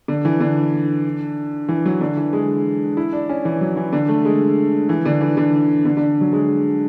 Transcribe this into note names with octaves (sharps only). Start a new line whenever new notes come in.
D3
E3
D3
E3
F#3
D3
E3
G#3
E4
D4
C#4
E3
F#3
E3
D3
A3
G#3
E3
D3
E3
D3
D3
D3
F#3
G#3